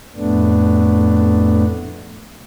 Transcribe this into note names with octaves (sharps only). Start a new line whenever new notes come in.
F2 A2 A3 B3 D4